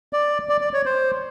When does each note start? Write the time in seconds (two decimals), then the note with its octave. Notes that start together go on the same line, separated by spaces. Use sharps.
0.13 D5
0.49 D5
0.61 D5
0.73 C#5
0.86 C5